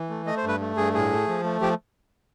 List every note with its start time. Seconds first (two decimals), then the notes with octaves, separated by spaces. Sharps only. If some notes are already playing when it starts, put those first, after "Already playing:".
Already playing: E3
0.10 A3
0.26 A3 D#5
0.37 C5
0.43 G2
0.48 B4
0.60 A3
0.77 G2 G#4
0.94 A2 G#4
1.10 A3
1.28 F3
1.44 A3
1.61 F3 G4